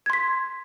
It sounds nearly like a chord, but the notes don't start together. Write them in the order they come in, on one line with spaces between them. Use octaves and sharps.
G#6 C6 B6